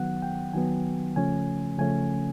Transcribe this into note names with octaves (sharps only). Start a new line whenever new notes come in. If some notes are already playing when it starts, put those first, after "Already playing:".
Already playing: D#3 F#3 B3 F#5
G5
D#3 F#3 B3 G#5
C#3 F3 A3 C#4 G#5
C#3 F3 A3 C#4 G#5